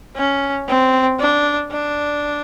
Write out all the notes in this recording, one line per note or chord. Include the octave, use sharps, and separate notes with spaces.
C#4
C4
D4
D4